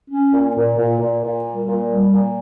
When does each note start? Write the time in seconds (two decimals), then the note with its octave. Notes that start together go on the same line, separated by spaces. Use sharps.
0.11 C#4
0.33 A#2
0.56 A#2
0.78 A#2
1.00 A#2
1.23 A#2
1.45 G3
1.67 A#2
1.90 G3
2.13 A#2